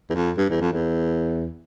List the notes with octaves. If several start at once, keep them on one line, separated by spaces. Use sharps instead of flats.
E2
F2
G2
E2
F2
E2